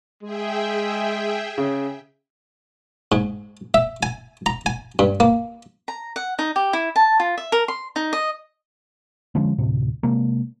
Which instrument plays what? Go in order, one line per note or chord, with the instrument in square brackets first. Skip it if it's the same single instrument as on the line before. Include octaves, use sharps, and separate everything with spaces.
[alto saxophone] G#3 [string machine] G#4 E5 G5
[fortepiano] C#3
[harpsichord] G#2
E5
G#5
A#5
G#5
G2
A#3
[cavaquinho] A#5
F#5
D#4
G4
E4
A5
F4
E5
A#4
C6
D#4
D#5
[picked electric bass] D3 F3 G#3 C#4
D2 A2 C3
C3 G#3 A#3